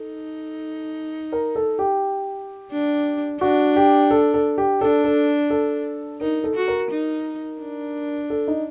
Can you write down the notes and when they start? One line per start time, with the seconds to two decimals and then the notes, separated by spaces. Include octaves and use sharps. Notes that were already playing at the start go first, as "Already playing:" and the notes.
Already playing: D#4 A4
1.32 A#4
1.56 A4
1.79 G4
2.72 D4
3.41 D4 F#4
3.76 G4
4.11 A4
4.34 A4
4.58 G4
4.81 D4 A4
5.04 A4
5.50 A4
6.21 D#4 A#4
6.44 A4
6.56 F#4
6.68 A#4
6.91 D#4
7.61 D4
8.30 A4
8.48 D#4